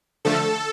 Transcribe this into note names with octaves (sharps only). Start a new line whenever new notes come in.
D3 F3 A3 A4